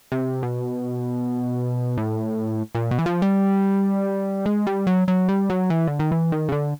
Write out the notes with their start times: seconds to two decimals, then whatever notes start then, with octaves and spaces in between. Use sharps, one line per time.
0.12 C3
0.43 B2
1.98 A2
2.75 A#2
2.91 B2
2.99 E3
3.06 F3
3.22 G3
4.46 G#3
4.67 G3
4.87 F#3
5.08 F#3
5.29 G3
5.50 F#3
5.70 E3
5.87 D3
5.99 D#3
6.11 E3
6.32 D#3
6.49 C#3
6.52 D3